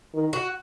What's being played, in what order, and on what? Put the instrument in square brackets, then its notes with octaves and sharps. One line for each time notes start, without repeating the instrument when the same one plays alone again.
[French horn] D#3
[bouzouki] F#4